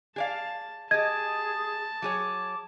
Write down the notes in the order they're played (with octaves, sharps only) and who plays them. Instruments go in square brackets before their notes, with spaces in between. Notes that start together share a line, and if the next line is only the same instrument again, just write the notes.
[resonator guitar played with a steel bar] G#4 D5 F5 [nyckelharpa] A5
[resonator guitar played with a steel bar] G4 D#5 [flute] G#4 [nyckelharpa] A5 [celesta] G#6
[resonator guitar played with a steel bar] F#3 G#4 C#5 [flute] D6